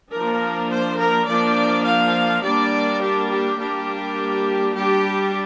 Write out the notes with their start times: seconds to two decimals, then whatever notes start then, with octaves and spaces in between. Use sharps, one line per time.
0.12 F3 A#3 D4 A#4
0.70 C5
0.99 A#4
1.28 F3 A#3 D4 D5
1.85 F5
2.43 G3 A#3 D4 D5
3.01 G4
3.30 G4
3.59 G3 A#3 D4
4.74 G3 D4 G4